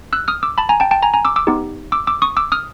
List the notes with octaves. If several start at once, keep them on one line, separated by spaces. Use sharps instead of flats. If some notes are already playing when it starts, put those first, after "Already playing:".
E6 F#6
D#6 F6
D6 E6
A5 B5
G#5 A#5
G5 A5
G5 A5
G#5 A#5
G#5 A#5
D6 E6
D6 E6
B3 D#4 G4
D6 E6
D6 E6
C#6 D#6
D6 E6
D#6 F6